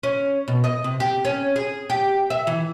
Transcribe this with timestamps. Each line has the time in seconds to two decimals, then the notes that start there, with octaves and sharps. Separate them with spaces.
0.03 C#4
0.48 B2
0.64 D#5
0.84 C3
1.00 G4
1.25 C#4
1.56 G#4
1.90 G4
2.30 E5
2.47 E3